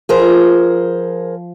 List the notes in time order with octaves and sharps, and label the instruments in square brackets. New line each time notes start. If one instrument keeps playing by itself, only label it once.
[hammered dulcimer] F3 [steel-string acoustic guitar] G#4 A#4 C5